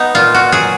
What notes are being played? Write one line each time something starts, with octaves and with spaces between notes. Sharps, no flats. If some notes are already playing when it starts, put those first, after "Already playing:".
Already playing: B3 D#4
A#2 F4
F#4
F#3 G#4